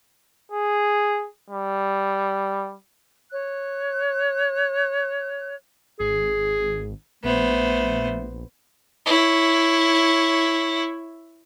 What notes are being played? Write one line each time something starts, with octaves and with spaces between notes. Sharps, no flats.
G#4
G3
C#5 F#6
G#1 G#4
A#1 A3 B3 C5
E4 C#5